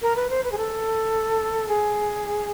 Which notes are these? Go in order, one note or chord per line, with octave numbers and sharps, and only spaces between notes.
A#4
B4
C5
B4
G#4
A4
G#4